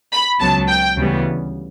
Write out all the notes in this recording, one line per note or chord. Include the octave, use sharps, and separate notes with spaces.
B5
C#2 C#3 F#3 B3 A5
G5
D2 C#3 E3 G3 B3